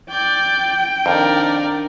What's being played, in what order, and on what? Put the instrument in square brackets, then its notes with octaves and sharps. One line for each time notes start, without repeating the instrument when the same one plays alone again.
[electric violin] D5 G6 [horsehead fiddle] G5
[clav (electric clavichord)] F2 [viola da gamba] D#3 D4 D#4 [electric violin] A#4 D5